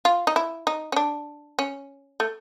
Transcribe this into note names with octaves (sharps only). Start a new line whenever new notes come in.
F4
D#4
E4
D#4
C#4
D4
C#4
A3